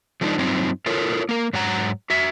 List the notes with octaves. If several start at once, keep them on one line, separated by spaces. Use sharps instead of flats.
F3 G#3 A3 D4 D#4
G2 F#3 C4 D#4 F4
E4 F4 A4 A#4 C#5
A#3 A#4
G#2 F#3 F#4 F#5 A#5
F#4 E5